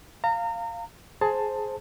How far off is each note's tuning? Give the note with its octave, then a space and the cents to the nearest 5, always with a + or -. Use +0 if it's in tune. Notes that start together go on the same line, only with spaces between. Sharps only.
F5 -5 A#5 -30
G#4 +20 C5 +5 A5 +15